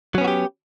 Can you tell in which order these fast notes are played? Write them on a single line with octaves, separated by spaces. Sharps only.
F#3 C#4 B3 F#4 G4